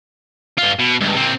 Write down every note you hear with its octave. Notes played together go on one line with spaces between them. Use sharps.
G2 F4
B2
C#2 G2
A#2 C4